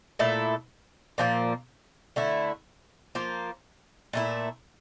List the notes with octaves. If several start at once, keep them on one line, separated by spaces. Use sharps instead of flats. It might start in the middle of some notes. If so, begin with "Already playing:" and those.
A#2 A3 E4 A4
A#2 F3 A#3
D3 A3 E4
F3 A#3 F4
A#2 A3 E4